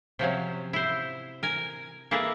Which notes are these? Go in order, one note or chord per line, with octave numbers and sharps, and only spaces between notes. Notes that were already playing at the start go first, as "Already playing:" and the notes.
C3 F3 F#3 C#4
E4 C5
A#4 G#5
A#3 E4 G#4 A4 B4 A#5